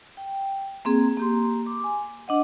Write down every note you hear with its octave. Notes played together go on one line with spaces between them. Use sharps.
G5
A#3 C4 G#4
A#3 G4 C6
D6
G#5
D4 D#5 F#5